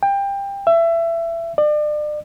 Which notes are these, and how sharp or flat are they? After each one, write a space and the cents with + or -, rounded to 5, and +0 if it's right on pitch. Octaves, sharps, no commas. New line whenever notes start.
G5 +20
E5 +25
D5 +35